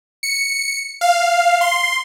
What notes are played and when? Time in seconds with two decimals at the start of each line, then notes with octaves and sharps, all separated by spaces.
0.23 C#7
1.01 F5
1.61 C6